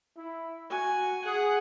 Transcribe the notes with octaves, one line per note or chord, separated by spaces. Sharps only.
E4
F#4 G#5
G#4 F#5